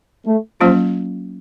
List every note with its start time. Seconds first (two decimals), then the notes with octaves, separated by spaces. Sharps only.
0.26 A3
0.61 F3 F#3 A#3 C#4 F4